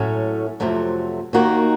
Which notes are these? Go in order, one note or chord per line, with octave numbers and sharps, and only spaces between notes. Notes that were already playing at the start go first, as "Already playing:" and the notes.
Already playing: A2 F#3 A3 C#4
F2 C3 F#3 A3
D#2 D#3 A#3 D#4 F#4